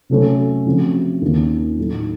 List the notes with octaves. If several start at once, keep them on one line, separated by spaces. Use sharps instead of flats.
C3 F#3 A3 C#4
C#3 F3 A3 C4 F#4
D#2 D#3 A#3 C#4 F4
A2 F#3 A3 D#4